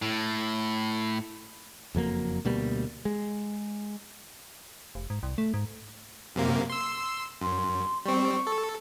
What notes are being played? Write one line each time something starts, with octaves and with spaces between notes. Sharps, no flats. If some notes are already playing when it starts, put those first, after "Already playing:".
A2
F#1 F2 F#3 A#3
D2 B2 G3 A#3
G#3
F1
G#2
C2
A3
G#2
F#2 C3 A#3
C6 E6
F#2 C6
G3 C4 C#6
A4